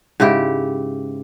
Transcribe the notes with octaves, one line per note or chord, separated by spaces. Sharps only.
G#2 C#3 E4 G4